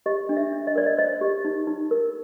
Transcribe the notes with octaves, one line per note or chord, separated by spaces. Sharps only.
G4 D#5
D4
E5
D4
D#5
A#4 D5
D#5
C5 D#5
G4
D#4
D#4
A#4